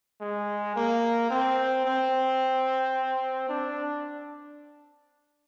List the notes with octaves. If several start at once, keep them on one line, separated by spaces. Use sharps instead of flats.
G#3
A#3
C4
C4
D4